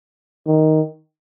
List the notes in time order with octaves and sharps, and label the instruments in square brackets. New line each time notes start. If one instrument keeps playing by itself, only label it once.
[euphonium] D#3